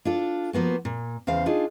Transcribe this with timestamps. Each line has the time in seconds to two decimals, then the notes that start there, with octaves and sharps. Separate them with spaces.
0.05 D4 F4 A4
0.53 F3 A#3 B3 F#4
0.85 A#2
1.27 E2 C#3 C5 F5
1.46 D4 D#4 F4 G#4